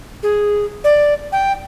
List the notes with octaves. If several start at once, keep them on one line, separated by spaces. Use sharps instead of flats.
G#4
D5
G5